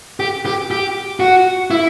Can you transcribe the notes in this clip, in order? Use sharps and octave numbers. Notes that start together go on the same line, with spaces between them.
G4
G4
G4
F#4
E4